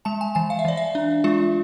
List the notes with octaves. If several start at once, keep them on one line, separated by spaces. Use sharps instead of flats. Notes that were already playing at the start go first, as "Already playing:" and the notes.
G#3 A5
G#5
E3 G#5
F5
E5
E3 D5
E5
D4
G#3 F4